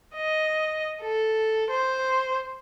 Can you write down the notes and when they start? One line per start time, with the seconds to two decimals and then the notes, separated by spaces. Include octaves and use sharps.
0.16 D#5
1.03 A4
1.71 C5